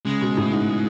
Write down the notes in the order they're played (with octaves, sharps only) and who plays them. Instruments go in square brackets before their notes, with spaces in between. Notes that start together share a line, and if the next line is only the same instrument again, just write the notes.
[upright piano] C#3 [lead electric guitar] G#3
[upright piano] B2
A2
G#2